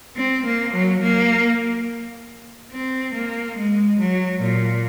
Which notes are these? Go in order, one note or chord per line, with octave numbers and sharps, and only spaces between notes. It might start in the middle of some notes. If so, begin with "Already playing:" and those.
C4
A#3
F#3
A#3
C4
A#3
G#3
F#3
A#2